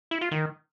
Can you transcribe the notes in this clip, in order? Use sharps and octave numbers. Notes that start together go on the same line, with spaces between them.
E4
F4
D#3